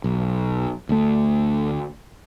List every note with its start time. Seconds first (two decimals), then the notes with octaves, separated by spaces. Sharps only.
0.04 B1
0.89 D2 A3